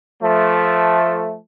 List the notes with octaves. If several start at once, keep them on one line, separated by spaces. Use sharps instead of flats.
F3 A3